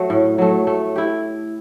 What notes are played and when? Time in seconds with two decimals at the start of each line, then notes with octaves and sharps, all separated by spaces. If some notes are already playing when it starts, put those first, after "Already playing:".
Already playing: F#3 A3
0.10 A2
0.38 F#3 A3
0.67 A3
0.96 E4 G4